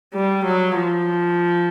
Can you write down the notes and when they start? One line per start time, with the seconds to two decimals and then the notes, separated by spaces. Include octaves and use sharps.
0.15 G3
0.45 F#3
0.76 F3